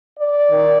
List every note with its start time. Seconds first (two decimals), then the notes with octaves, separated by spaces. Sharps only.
0.19 D5
0.49 D#3